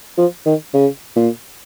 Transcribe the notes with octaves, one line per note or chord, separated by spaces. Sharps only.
F3
D#3
C#3
A#2